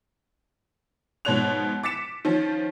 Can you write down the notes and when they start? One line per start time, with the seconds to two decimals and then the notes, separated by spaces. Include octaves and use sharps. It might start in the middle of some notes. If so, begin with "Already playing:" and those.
1.25 G#2 B2 F3 C#5 F#6 F7
1.83 D6 A6 B6 C#7 E7
2.25 D#3 F3 C#4